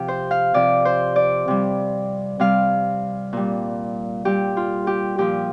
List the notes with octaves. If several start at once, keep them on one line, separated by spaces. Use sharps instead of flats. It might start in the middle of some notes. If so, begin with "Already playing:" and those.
Already playing: C3 F3 G4
C5
F5
C3 F3 D5
C5
D5
C3 G3
C3 G3 F5
A#2 G3
A#2 G3 G4
F4
G4
A#2 F3 G4